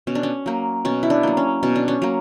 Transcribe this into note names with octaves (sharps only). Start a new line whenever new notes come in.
B2 C#4
D4
C#4
F#3 A#3
B2 C#4
E4
D4
F#3 A#3
C#4
B2 C#4
D4
C#4
F#3 A#3